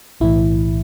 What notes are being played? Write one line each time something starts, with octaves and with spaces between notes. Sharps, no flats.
B1 A2 E3 E4